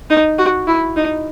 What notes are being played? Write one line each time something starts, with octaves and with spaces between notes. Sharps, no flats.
D#4
F#4
E4
D#4